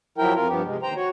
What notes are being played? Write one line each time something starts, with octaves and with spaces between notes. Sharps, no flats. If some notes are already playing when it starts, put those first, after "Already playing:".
F3 F#3 E4 A#4 G5
F2 F4 A#4
G2 F3 B3 G4
C3 G#3
D#2 C5 G5 A#5
F#4 C#5